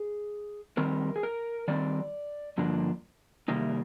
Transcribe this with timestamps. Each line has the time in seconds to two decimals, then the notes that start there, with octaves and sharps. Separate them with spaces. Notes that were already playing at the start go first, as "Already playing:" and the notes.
Already playing: G#4
0.77 D#3 G3 C4 A#4
1.16 G#4
1.23 A#4
1.68 D#3 G3 C4 D5
2.58 G2 D3 F3 A#3 D4
3.48 C3 D#3 G3 A#3 D#4